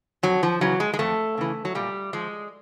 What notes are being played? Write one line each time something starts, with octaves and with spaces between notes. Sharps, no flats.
F2 F#3
F3
C#3 E3 F#3
G#3
G#3
F2 A3
C#3 E3
F#3
A#2 G3
F3 G#3